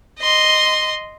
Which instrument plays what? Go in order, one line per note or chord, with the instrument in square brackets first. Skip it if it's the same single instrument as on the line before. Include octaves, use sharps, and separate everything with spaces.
[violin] D#5 C6